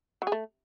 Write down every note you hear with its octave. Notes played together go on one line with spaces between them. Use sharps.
F#3
G#4
A3